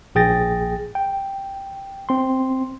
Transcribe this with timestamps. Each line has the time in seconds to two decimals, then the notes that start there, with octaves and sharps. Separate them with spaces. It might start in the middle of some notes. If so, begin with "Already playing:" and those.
0.15 A#1 G#4 G5 A6 A#6
0.95 G5
2.09 C4 C6